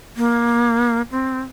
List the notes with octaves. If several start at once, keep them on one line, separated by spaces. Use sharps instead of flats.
A#3
C4